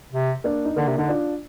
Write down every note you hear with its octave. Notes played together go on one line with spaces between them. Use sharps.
C3
A#3 D4
D#4
D3 A#3 D4
C3
D3 D#4
D4 F4